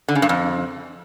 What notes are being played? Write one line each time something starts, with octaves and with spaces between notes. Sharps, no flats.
D3
C#3
G2
F2